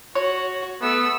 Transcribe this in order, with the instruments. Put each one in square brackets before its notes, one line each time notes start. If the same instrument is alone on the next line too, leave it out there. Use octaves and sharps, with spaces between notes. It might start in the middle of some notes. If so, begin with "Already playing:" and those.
[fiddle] F#4 [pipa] C#5
[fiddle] A3 E6 [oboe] B3